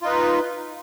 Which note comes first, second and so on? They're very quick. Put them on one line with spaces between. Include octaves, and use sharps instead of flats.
F4 D#4 B4